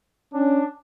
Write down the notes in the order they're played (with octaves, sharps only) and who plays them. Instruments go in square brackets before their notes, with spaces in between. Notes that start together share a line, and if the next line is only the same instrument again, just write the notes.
[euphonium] C#4 [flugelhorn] D4